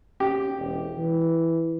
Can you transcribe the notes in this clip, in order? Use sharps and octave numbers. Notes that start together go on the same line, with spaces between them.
C#4 G4
E1
E3